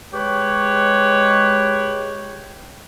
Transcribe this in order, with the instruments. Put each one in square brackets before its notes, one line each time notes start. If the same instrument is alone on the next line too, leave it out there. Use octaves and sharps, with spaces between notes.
[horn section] G#3 G4 B4 C#5